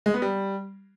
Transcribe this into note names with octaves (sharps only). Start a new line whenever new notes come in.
G#3
B3
G3